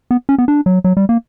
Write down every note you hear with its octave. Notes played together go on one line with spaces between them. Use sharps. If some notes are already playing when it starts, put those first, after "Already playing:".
B3
C#4
B3
D4
F#3
F#3
G3
A#3